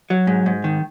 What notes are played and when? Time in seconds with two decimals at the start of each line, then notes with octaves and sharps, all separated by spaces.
0.10 F#3
0.27 G#2
0.46 G#2
0.64 D#3